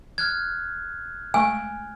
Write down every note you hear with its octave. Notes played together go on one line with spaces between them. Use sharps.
F6 F#6 G#6
G#3 A3 G#5 C#6